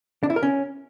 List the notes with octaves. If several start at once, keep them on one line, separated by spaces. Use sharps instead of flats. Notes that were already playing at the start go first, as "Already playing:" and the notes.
D4
E4
A#4
C#4